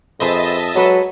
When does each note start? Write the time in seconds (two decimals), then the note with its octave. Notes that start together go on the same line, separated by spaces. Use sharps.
0.20 F2 G#4 B4 C5 D#5 E5 A5
0.75 F#3 G#3 A4 B4